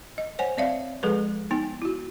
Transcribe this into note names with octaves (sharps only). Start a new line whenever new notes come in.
D#5
C5 C#5 F#5 G#5
C4 C#5 D5 E5 F5
F3 G#3 G#4 A4 B4
B3 D#4 G5 G#5
E4 F#4